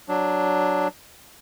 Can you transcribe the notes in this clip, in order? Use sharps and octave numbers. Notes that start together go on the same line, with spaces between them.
F#3 D4